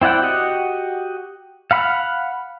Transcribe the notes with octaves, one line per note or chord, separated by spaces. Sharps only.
C4 E4 D5 F#5 G5
F#4 G4 D#5 F#5
F5 F#5 B5 C6 F6